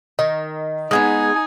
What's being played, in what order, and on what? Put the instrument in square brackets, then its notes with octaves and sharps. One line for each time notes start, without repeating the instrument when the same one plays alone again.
[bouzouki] D#3 [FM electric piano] D#5
[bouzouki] G#3 A#3 B3 [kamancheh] D#4 G#5 [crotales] D#6 G#6